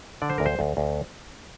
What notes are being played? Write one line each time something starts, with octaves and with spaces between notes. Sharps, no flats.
D3 D5
C5
D2 A#4
C5
D2
D2